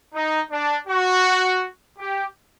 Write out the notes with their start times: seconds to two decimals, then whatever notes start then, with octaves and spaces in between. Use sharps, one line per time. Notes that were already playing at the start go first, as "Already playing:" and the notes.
0.13 D#4
0.50 D4
0.87 F#4
1.98 G4